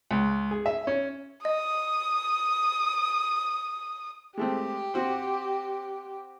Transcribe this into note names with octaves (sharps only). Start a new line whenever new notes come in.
C#2
G#4
E5
C#4
D#5 D#6
G#3 A3 C4 G4
C4 F#4 C5